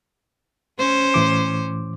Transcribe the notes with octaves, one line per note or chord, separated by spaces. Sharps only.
C#4 C5
A2 E3 D6